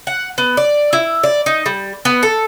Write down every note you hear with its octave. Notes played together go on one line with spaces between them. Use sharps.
F#5
B3
D5
E4
D5
D#4
G3
B3
A4